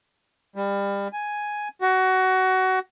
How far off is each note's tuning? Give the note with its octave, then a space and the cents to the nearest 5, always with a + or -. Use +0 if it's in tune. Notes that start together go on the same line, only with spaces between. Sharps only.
G3 +30
G#5 +5
F#4 +20